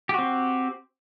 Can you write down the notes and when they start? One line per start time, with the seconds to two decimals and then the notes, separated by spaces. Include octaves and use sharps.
0.09 G4
0.14 F#4
0.19 C4